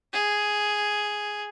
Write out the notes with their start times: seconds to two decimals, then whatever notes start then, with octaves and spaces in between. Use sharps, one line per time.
0.13 G#4